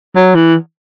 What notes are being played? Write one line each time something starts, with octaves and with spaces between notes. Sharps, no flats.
F#3
E3